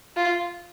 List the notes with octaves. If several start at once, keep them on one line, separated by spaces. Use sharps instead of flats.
F4